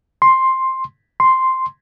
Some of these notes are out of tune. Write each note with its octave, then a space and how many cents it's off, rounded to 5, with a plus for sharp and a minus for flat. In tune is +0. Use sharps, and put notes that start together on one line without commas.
C6 +10
C6 +0